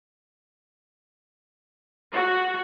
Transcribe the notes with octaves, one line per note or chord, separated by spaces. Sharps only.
F#4